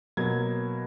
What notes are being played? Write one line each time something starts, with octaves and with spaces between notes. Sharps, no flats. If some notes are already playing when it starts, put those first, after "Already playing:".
B2 F#3 A#3 G#6